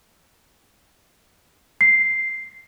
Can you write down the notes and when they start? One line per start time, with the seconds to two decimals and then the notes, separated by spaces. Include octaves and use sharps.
1.81 C7